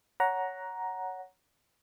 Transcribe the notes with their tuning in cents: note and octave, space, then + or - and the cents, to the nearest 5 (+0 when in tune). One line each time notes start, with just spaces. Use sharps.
C#5 +10 F#5 +0 A#5 +10